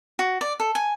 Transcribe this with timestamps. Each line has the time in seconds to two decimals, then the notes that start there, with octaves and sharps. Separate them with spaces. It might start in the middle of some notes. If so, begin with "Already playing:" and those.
0.19 F#4
0.41 D5
0.60 A4
0.75 G#5